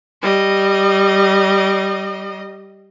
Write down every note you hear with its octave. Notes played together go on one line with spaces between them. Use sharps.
G3 D#5